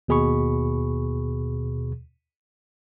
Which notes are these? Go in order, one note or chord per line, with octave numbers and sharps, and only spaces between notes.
D#2 B2 G#4 B5 C#6